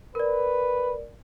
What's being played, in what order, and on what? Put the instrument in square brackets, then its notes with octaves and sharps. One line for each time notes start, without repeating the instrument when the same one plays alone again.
[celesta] A#4 D5 [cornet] B4